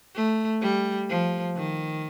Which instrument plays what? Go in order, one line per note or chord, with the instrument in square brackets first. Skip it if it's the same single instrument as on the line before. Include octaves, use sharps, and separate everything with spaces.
[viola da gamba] A3
G3
F3
D#3